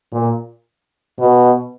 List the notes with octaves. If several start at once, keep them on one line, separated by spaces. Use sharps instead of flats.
A#2
B2